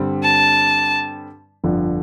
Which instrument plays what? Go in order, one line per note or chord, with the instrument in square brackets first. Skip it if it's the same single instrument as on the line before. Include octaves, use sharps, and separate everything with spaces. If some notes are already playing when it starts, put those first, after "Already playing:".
Already playing: [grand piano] G2 D3 G3 C4
[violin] A5
[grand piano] G1 F2 D3 F3